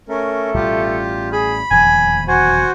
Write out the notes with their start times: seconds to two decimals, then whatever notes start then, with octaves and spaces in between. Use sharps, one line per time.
0.09 A3 C#4 A#4
0.54 A1 B2 G3 F4 G4
1.32 G#4 B5
1.71 D#1 E2 F3 G#5
2.28 F#4 C5 F#5 G#5